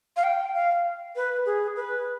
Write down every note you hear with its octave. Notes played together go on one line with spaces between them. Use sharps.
F5
G5
F5
B4
G#4
B4